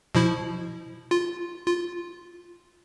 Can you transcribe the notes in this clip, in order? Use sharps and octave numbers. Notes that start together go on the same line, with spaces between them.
B2 F3 E4
F4
F4